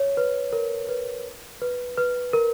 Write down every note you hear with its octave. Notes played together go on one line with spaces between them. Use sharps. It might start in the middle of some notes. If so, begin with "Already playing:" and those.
Already playing: C#5
B4
A#4
B4
B4
B4
A#4